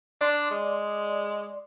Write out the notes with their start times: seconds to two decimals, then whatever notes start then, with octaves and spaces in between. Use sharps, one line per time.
0.21 D4 D5 C6
0.51 G#3